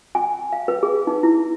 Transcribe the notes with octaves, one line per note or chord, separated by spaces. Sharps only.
G#5
F5
B4
G#4
D#4
E4